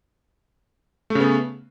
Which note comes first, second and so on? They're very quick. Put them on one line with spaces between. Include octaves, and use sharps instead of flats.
A3 C#3 B3